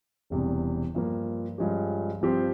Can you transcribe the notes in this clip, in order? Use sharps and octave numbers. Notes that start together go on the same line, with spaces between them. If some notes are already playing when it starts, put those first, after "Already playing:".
E1 E2 C3 G3
G2 F3 A#3
G2 F3 G#3 C#4 G4
G2 F3 C4 G4 C5